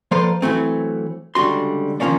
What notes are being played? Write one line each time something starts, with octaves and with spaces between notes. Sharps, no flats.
F3 A#3 A4 B4 C5 D5
E3 F#3 A3 C4
C#2 D3 G3 F#4 C6
D#3 F3 F#3 A#3 C#4 D4